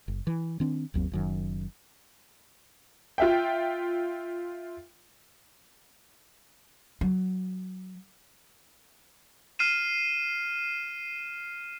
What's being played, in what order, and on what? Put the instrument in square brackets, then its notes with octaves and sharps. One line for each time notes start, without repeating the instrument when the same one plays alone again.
[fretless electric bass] F#1
E3
D#3 C4 D4
G1 D#2 F#3 C4
F#1 F#2 D#3
[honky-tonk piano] F4 E5 G5
[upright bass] F#3
[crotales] F6 C7 D#7 E7